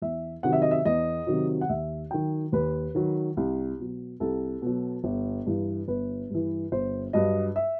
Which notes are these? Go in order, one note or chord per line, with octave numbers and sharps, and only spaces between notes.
E2 E5
C3 D#3 F#3 F#5
E5
D#5
E5
E2 D#5
C3 D#3 F#3
F#5
D#2 E5
D#3 F#3 G5
D#2 B4
D#3 F#3
C2
B2 F#3
C2 A4
B2 F#3
G1
G2 E3
G1 B4
G2 E3
G1 C5
G2 F#3 D#5
E5